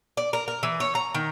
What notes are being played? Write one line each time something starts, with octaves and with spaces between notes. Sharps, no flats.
D5
A#4
A#4
E3
C#5
A#5
D#3